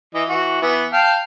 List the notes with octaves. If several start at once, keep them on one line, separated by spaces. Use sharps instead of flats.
E3 D#5
E3 F#4
E3 B3
F5 G5 A5